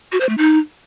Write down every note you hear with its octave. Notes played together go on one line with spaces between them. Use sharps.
F#4
C5
A3
D#4